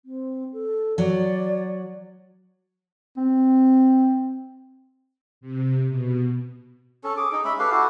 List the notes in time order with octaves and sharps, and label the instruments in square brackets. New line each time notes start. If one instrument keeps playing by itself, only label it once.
[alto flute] C4
A4
[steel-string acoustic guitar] F#3 [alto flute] D5
[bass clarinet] C4
[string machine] C3
B2
[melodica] C#4 A4
G#4 D6
D#4 G#4
G#3 C#4 E5 B5
G4 A4 B4 F5
E4 F#4 G4 A4